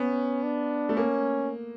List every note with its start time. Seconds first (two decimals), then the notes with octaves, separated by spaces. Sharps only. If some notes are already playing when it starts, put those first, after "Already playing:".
Already playing: B3 C#4
0.43 D4
0.89 A3
0.97 A#3 C#4